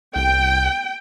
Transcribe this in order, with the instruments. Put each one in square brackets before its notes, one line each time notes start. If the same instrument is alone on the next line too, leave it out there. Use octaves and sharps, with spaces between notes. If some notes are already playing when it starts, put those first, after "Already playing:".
[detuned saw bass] C2 [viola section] G5